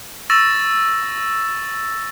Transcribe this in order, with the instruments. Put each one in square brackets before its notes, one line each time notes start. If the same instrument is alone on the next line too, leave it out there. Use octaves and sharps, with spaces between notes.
[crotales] C#6 E6 A6 A#6 E7